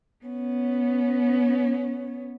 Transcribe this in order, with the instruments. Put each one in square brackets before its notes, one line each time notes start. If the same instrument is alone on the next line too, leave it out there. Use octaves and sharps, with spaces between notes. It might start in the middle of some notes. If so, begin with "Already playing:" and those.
[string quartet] B3 C#4